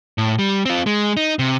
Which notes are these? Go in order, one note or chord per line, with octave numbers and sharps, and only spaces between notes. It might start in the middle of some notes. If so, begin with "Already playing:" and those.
A2
G3
C4 F4
G#3
D#4
C3